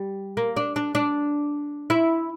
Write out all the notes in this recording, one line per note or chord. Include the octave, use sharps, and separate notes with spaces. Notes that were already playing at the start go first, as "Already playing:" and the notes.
Already playing: G3
A#3
D4
D4
D4
E4